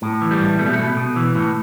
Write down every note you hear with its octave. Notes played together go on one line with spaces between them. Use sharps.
A2
E3
G3
A2
B2 A3
G3
A3
B2
B2
E3
A2